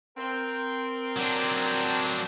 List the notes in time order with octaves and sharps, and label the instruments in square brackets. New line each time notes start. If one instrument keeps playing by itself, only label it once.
[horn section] C4 A#4
[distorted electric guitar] F#3 D4